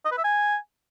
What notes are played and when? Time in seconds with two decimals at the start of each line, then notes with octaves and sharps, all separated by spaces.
0.05 D#5
0.12 B4
0.18 E5
0.24 G#5